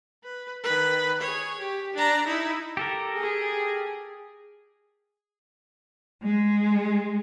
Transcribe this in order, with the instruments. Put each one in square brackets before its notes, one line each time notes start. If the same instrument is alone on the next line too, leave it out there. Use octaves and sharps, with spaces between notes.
[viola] B4
D#3 B4
G#4 C#5
G4
D4 A#5
D#4 E4
[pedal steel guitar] G4 A4 A#4
[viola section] G#4
[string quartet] G#3